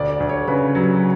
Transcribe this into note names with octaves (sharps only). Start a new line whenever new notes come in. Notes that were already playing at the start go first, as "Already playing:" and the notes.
Already playing: D2 D5
D5
D2
C#5
C#3 B4
F#3